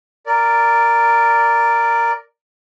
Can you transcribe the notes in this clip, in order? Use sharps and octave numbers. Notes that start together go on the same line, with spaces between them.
A#4 D5